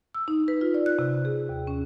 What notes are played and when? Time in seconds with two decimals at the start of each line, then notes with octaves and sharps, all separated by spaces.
0.14 E6
0.28 D#4
0.48 B4
0.61 F4
0.74 D5
0.86 F#6
0.99 C3
1.25 G#4
1.49 D#2
1.67 C#4